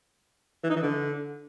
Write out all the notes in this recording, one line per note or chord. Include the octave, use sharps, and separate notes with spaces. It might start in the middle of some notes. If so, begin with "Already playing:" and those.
E3
D#4
E3
D3